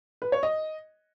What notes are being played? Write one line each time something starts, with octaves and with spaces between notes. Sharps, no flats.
B4
C#5
D#5